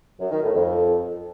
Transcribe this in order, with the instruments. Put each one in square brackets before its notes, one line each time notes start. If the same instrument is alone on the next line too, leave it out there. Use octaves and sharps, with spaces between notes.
[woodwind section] F#2
D#3
A2
F2